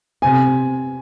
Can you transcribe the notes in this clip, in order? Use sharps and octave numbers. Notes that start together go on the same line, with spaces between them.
C3 G#5